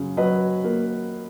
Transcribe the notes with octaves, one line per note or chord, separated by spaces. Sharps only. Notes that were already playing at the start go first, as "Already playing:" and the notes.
Already playing: F#2 C#3
F#3 B4 D#5
A#3